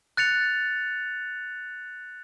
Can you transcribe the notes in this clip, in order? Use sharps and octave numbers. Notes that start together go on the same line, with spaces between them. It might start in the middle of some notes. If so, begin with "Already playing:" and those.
F#6 A6 C#7 F7